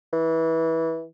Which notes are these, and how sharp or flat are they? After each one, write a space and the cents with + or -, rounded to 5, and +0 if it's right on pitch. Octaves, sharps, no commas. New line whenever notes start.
E3 -20